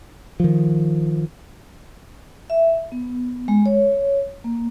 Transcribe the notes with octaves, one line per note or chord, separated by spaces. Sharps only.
D#3 F3
E5
B3
G#3
C#5
A#3